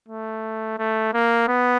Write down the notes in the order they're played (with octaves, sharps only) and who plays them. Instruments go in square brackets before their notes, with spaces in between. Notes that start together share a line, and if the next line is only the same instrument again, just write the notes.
[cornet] A3
A3
A#3
B3